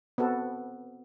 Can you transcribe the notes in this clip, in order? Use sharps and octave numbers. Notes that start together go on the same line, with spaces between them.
B3 C4 F#4 A4